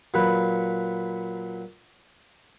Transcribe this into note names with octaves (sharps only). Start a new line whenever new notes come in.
A#2 F#3 B4